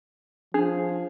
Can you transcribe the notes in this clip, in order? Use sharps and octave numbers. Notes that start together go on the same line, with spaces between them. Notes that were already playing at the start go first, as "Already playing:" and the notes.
F3 D4 G#4